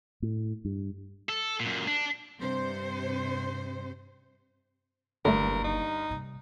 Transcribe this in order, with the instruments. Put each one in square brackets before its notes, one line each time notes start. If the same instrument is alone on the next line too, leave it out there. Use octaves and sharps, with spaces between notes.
[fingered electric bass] A2
G2
[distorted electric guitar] A4
F#2 A#2
D4
[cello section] G2 C3 C5
[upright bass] F#1 C2 [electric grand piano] G2 [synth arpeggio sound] D3 G3 A3 [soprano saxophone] A#4
[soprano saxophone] D#4
[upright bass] G2 C3